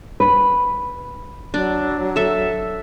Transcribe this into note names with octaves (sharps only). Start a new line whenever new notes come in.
B4
F#3 D4
A4 E5